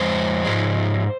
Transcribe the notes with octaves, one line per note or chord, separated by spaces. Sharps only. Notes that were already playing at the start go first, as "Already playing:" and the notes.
Already playing: F2 G#3 C5
G#2 F3 G#3